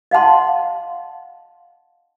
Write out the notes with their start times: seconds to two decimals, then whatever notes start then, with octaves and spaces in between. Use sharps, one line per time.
0.11 D#5 F5 F#5 A5 C6